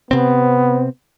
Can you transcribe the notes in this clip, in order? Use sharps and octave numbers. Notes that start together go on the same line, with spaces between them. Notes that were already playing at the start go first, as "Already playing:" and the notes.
C3 B3 C4